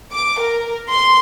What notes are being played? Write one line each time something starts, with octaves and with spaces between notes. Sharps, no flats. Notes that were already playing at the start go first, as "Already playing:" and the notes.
D6
A#4
C6